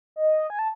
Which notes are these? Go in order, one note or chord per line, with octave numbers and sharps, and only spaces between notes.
D#5
G#5
A5